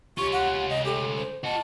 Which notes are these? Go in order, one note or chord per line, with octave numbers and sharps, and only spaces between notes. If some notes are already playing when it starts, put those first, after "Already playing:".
C#4 F4 G4 C#6
F#5
D#5
G4 A4
C5
F4 D#5 F#5 A5